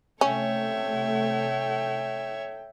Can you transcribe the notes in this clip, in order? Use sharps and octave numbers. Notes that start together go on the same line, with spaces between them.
C3 A3 C#4 A4 C#5 E5 G5